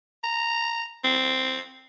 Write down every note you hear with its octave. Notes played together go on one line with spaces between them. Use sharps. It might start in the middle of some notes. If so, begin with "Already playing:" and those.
A#5
C4